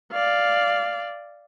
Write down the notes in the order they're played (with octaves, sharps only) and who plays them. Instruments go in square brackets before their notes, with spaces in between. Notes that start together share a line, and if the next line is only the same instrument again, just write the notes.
[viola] D5 F5